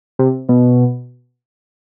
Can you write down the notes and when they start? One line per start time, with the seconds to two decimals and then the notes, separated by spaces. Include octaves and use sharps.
0.19 C3
0.49 B2